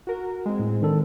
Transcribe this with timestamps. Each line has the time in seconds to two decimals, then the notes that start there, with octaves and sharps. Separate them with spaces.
0.07 F#4 A#4
0.46 G#3 C4
0.60 A2
0.82 D#3 D4 A4